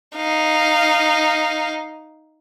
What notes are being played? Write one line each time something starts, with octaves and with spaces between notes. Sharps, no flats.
D#4 F5